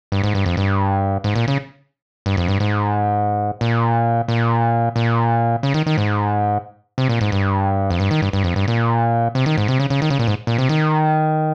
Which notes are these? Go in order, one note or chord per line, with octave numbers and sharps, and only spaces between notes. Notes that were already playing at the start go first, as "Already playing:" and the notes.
G2
G#2
G2
F2
G2
G#2
A#2
C#3
G2
F2
G2
G#2
A#2
A#2
A#2
C#3
D#3
D#3
G#2
C3
A#2
G#2
G2
F2
G2
D#3
G2
G2
F2
G2
A#2
C3
D#3
G#2
C3
C#3
C#3
D#3
C#3
A#2
G#2
A#2
C3
D#3